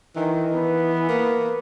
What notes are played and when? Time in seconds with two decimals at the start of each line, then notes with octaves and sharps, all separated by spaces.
0.16 D#3 E3
0.54 B3
1.08 A#3